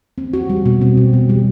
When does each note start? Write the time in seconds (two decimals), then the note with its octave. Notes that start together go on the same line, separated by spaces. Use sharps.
0.18 C4
0.33 F#4
0.49 G3
0.66 B2
0.81 C4
0.97 B2
1.13 B2
1.29 G3